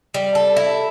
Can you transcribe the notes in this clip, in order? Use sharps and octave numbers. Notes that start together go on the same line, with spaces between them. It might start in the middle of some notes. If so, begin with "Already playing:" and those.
G3
A4
E4